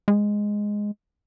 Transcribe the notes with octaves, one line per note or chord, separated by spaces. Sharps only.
G#3